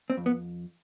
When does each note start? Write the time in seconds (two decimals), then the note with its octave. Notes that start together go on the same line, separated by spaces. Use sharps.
0.10 C4
0.17 F2
0.26 B3